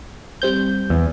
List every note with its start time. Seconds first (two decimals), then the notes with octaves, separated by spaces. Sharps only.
0.42 G3 C4 G6
0.90 E2